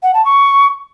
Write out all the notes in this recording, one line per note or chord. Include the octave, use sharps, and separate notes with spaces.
F#5
A5
C#6